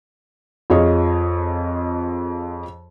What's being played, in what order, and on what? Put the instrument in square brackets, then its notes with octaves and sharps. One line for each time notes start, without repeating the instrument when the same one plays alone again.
[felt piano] F2 F4 G#4 C#5 D#5